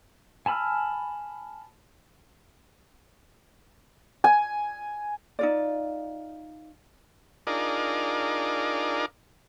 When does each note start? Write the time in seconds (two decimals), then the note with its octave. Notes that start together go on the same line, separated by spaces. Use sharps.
0.46 G#5 A5 B5 E6 F6
4.24 G#5
5.39 D#4 F4 D5
7.47 D4 D#4 F4 G#4 A#4 D5